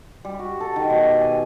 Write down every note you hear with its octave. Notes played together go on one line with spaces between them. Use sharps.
G3
F#4
A4
D#3
B2
G4
G#5